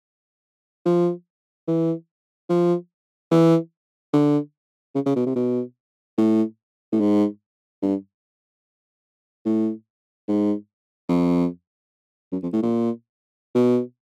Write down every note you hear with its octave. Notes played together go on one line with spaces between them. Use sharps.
F3
E3
F3
E3
D3
C#3
C#3
B2
C3
B2
A2
A2
G#2
G2
A2
G#2
F2
F#2
F2
A2
A#2
B2